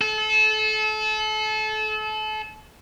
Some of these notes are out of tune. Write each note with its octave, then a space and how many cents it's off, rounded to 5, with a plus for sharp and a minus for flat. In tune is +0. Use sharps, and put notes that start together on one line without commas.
A4 -30